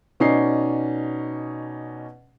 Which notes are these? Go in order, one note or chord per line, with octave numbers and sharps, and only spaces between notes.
B2 C#4 D#4 D5 C7